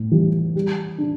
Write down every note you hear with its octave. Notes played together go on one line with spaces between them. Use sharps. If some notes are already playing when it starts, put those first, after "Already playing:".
Already playing: A2
E3 G3
G3
D4